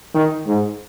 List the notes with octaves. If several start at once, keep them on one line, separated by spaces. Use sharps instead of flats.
D#3
G#2